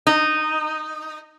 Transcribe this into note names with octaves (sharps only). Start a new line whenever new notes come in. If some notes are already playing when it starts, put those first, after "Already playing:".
D#4